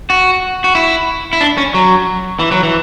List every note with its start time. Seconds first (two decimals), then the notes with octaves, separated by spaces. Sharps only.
0.10 F#4
0.64 F#4
0.75 E4
1.33 E4
1.41 D4
1.58 C#4
1.74 F#3
2.39 E3
2.51 F#3
2.63 E3